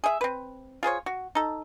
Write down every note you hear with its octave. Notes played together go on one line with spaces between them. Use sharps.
G#4 E5
C4 B4
F4 G#4 C5 C#5
F#4
D#4 A4